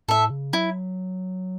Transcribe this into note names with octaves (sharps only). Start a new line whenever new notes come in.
A2 A4 E5
C#3
F#3 E4